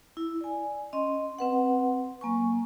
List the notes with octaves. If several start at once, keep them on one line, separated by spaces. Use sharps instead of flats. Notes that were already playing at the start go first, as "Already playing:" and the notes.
E4
D5 G#5
C#4 D#5 C6
C4 B4 F#5
F#3 A#3 G#5 C#6